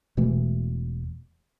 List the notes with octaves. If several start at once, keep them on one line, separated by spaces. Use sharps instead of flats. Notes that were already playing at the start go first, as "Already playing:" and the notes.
E1 B2 E3 A3